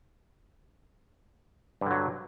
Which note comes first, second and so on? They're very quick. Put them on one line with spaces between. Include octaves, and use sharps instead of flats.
G2 D3 F#3